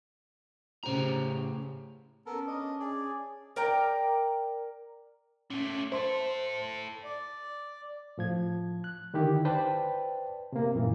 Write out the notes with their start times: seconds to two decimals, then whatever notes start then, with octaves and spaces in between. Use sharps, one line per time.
0.83 A2 C#3 G4 C5 A#5
2.26 B3 C#4 A4 A#4
2.47 D4 D#5
2.80 G#4 D5
3.56 A#4 D5 G5 A#5
5.50 A#2 A3 C#4
5.92 E4 A4 C5 C6
7.04 D5
8.18 A2 F3 G#6
8.84 F#6
9.14 D3 D#3 E4 G4
9.45 B4 C5 D5 G5 A5
10.52 C3 A#3
10.75 F#2 A#2 E3